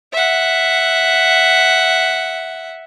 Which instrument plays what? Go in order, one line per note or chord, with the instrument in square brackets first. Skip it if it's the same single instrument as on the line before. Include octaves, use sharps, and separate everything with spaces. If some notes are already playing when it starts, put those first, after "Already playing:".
[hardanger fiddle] E5 F#5